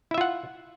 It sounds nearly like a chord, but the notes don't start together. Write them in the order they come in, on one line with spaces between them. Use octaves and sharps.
E4 E5 F4 F#5